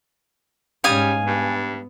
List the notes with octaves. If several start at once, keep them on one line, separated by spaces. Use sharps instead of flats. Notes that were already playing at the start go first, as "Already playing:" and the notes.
G#2 G3 C#4 F5 G#5 D#6
G2 B3